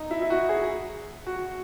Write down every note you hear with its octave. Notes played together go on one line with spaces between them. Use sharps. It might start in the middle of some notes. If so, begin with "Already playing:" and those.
Already playing: D#4
E4
E4
F#4
G#4
F#4